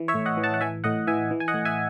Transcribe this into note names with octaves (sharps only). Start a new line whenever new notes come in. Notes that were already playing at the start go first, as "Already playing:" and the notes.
Already playing: E3
C#5 E5
A2
D#5 F#5
E3
F#5 A5
F#5
E3 E5 G#5
A2 D#5 F#5
E3 E5 G#5
E3
G#5
D#5 F#5
A2
E5 G#5